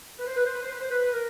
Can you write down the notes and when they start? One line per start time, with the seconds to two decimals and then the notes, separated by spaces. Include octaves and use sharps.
0.18 B4
0.26 C5
0.36 B4
0.45 C5
0.54 B4
0.62 C5
0.72 B4
0.81 C5
0.90 B4
1.12 A#4